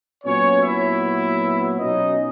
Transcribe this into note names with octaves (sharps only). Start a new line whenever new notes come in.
A#2 F#3 B3 C#4 C#5
E4 E5
B2 F#3 C#4 D#4 D#5